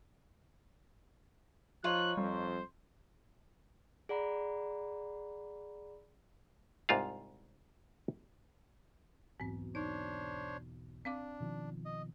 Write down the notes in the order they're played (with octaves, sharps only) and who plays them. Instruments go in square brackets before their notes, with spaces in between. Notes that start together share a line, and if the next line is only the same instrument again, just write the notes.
[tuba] F3 [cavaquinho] D#4 F4 C#5 [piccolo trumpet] F#6
[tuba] F2 [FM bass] G3 [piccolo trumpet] C5
[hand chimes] G#4 D5 F#5 A#5 B5
[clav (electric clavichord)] C2 G#2 C4 F4 F5
[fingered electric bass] B1 E2 B2 [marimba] G#2 C4
[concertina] D4 C5 C#5 [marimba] D#4
[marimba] C4 F5 D6 [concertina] D4
[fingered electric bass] B2 D#3 F3
[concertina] D#5